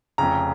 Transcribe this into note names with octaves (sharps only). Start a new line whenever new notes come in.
F1 F2 C#3 A#5